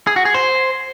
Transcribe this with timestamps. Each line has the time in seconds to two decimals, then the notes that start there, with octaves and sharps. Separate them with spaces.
0.07 G#4
0.16 F#4
0.25 G#4
0.34 C5